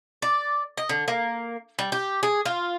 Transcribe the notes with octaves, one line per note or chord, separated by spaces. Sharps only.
D5
D#5
D3
A#3
G3
G4
G#4
F4